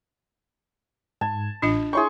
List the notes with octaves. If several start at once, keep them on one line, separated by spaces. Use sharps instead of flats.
G#2 A5 G#6
A1 D4 F4 D#5
E4 G#4 C#5 C6 C#6 G6